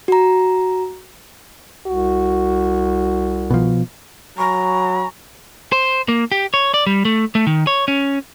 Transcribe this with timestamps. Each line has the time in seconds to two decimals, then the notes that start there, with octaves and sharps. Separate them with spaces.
0.08 F#4 A#5
1.87 C2 F#4
3.51 B2 F3
4.38 F#3 G#5 A#5 B5 C#6
5.72 C5
6.09 A#3
6.32 G4
6.54 C#5
6.74 D5
6.86 G3
7.05 A3
7.35 A3
7.47 D#3
7.67 C#5
7.88 C#4